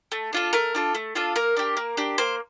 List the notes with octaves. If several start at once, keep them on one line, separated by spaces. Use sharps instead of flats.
A3
D4 F4 A4
A3 A#4
D4 F4 A4
A3
D4 F4 A4
A#3 A#4
D4 G4
A#3
D4 G4
A#3 C5